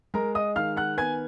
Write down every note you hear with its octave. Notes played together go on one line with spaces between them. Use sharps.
G#3 A#4 A#5
D#5 D#6
D#3 F5 F6
F#5 F#6
B3 G#5 G#6